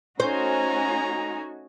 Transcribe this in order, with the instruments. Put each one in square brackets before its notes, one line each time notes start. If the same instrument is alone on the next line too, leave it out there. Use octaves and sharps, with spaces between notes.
[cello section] A3 D#4 F#4 [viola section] C#4 G#5 [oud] C5 [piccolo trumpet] A#5